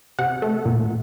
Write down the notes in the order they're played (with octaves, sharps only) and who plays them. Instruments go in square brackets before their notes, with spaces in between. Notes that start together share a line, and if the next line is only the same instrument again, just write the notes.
[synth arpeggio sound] C3 F#5
A3
A#2